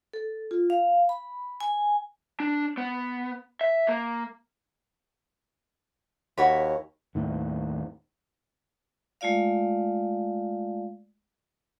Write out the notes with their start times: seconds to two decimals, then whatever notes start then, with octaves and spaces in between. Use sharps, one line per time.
0.13 A4
0.51 F4
0.70 F5
1.09 B5
1.61 G#5
2.40 D4
2.77 B3
3.61 E5
3.88 A#3
6.38 D#2 F#4 C#5 B5
7.15 D#2 A2 D#3
9.21 G#3 A3 F4 D5 F5